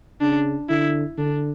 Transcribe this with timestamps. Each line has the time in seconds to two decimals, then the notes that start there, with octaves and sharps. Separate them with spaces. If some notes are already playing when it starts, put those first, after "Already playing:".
0.21 C#3 D4
0.69 D3 E4
1.18 D3 D4